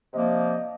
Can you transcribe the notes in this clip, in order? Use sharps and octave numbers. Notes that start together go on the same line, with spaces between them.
C3 F3 A#3 D4 D#5